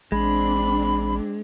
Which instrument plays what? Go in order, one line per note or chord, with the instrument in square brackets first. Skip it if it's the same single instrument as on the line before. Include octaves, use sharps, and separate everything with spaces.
[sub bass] A1 [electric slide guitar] G#3 [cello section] C4 D4 [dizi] B5